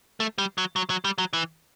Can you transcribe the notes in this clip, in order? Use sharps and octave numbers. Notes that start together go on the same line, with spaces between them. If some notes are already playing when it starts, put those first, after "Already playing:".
A3
G3
F#3
F#3
F#3
G3
F#3
E3